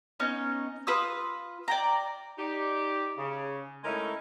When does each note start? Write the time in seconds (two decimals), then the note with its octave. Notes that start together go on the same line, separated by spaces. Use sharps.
0.20 B3 C#4 D#4
0.87 F4 B4 D#6 E6
1.68 D5 G5 A#5
2.38 D#4 G4 D5
3.17 C#3
3.84 G#3 A3 C#4 D#4 E4 A#4